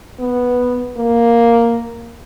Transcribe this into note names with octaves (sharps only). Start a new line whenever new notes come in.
B3
A#3